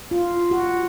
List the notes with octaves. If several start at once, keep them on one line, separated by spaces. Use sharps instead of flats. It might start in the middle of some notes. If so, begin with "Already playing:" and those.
F4
F#4